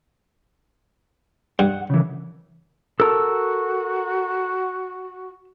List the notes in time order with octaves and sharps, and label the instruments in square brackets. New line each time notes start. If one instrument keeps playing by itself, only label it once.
[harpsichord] G2 [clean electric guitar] F#5
[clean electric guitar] C#3 E3
[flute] F#4 [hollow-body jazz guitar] A4 A#4 [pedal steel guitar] E6